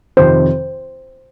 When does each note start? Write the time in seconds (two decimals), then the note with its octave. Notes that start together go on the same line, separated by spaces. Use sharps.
0.17 F2 C3 D#3 C5